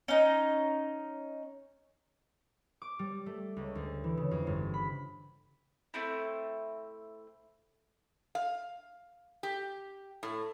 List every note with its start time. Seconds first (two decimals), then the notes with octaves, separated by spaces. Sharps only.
0.08 C#4 D#4
2.82 D6
2.99 G3
3.26 A3
3.57 C#2
3.75 D2
4.04 E3
4.17 C#3
4.31 F2
4.47 G1
4.74 B5
5.94 A3 C4 E4
8.35 F5
9.43 G4
10.23 A2